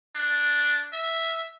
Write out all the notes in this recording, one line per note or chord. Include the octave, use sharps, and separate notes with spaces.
D4
E5